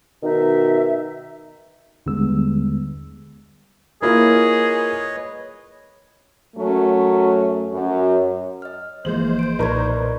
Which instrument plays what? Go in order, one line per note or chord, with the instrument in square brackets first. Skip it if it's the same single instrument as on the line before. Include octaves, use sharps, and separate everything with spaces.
[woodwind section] B2 D#3 D#4 E5
[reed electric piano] D#2 D3 G3 G#3 B3 E6
[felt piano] A#3 E4 F4 [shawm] G#4 [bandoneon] B4 C#5 D#5
[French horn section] F#2 F#3 A3 C#4
F#2 F#3
[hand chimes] D#5 F6
[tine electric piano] G1 E3 F3 [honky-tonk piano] G#3 F#7 [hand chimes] A#3 G#4 [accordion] C5
[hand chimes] G6 D7
[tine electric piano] B1 A#2 [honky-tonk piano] D#4 A#4 B4 [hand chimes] D5 C#6 G#6